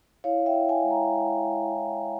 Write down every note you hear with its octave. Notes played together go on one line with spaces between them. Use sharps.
E4 C#5 F5
E5 G5
E4
F5 G#5
G#3
G5 A#5
G#3
G#3
E4
G#3